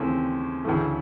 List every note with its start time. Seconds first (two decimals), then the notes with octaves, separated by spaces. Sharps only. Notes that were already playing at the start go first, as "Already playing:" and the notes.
Already playing: D#2 C#3 E3 A3 C4
0.64 D2 C#3 E3 A3